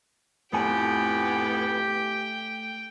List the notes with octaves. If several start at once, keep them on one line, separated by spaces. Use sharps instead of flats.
F2 A2 A3 B3 G4 G5 G#5